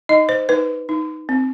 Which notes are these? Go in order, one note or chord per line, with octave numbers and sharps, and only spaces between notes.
D#4 D#5
C5
D#4 B4
D#4
C4